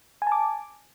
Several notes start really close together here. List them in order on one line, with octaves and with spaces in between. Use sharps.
G#5 A5 D6